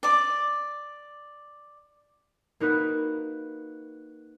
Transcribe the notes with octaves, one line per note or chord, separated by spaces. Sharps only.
D5 D6
A#3 D#4 F#4 B4